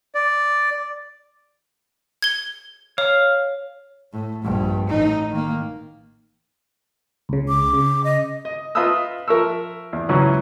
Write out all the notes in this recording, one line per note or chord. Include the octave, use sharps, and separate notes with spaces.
D5
G#6 G7
C#5 F5
A2
A#1 G2
A1 D#4
D#3 A#3
C#2 C#3
D6
C#3
D#5
D#5
F4 B4 D#5 E5 D#6 E6
F3 A#4 E5 C#6 E6
E2
C#2 E3 F#3 C#4